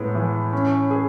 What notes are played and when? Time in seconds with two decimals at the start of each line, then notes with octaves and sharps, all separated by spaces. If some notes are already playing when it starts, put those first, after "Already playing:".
Already playing: A2 G#3 B3
0.15 E3
0.53 C#4
0.90 G#4